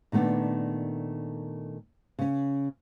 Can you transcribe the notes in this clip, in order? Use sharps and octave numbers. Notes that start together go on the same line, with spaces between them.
A#2 D#3 A3 B3 D4
C#3 C#4